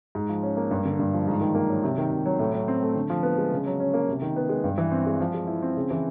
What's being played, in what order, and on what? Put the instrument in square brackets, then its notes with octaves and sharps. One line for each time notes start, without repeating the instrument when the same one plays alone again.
[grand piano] G#2
F3
C#4
A#3
G2
D3
G2
F3
G#2
D#3
A#3
F#3
C3
D#3
C3
F#3
A2
F#3
C4
A3
D3
F3
B3
G#3
C#3
F#3
C#4
A#3
C3
D#3
B3
G#3
G2
E3
C4
G#3
F3
G#3
E4
C4
C#3
E3